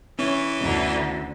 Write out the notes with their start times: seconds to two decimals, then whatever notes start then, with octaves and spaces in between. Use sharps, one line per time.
0.19 E3 C#4 C#5
0.60 D2 D3